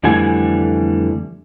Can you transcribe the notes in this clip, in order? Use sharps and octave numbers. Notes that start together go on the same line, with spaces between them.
F2 D3 E3 G3 A3 G#5